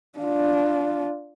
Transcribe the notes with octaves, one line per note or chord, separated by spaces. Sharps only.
D4 F4